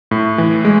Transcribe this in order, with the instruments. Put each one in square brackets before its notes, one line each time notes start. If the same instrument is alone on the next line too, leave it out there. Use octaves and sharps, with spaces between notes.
[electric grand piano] A2
E3
G#3